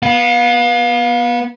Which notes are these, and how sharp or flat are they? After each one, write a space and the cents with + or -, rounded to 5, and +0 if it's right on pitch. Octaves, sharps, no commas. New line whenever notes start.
B3 -20 F5 +30